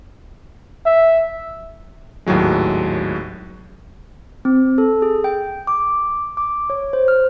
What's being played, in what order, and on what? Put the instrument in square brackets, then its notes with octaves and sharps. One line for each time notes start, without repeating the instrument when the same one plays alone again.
[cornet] E5
[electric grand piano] G#1 D#2 A2 F#3 G#3
[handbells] C4
A4
G#4
G5
D6
D6
C#5
C5
F6